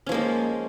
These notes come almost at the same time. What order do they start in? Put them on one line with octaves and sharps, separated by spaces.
C#4 F3 A#3 G#3